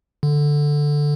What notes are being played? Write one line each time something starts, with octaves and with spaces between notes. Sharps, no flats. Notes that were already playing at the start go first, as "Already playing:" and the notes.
D3